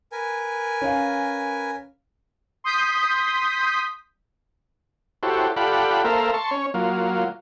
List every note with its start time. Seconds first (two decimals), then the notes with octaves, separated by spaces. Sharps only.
0.12 A#4 B4 G#5
0.81 C#4 F5
2.64 C6 D#6 G6 B6
5.23 E4 F#4 G4 A4 C5 C#5
5.56 F4 G4 A4 D5 F#5 B5
6.04 A#3 A4 A#4 C5 E5 F5
6.34 A5 C6 C#6
6.51 C#4 C#5
6.74 F#3 A#3 F4